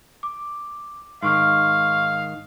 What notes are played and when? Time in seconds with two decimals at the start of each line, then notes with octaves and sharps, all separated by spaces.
0.23 D6
1.23 G#2 D#3 F5 C6 C#6 F6